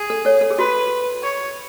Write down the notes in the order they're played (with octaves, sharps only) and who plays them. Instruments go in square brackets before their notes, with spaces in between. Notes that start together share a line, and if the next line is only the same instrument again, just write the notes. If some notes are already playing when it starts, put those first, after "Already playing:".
Already playing: [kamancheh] G#4
[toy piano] A4
A4 C#5
A4
G#4
[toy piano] F#4 [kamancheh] B4
[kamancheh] C#5